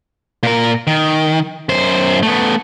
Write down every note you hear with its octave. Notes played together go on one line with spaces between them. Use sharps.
A#2 A#4
D#3
F#2 C5
A3 B3